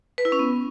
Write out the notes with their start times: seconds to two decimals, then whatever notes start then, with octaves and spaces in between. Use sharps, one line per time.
0.18 B4
0.25 E4
0.32 C#4
0.39 B3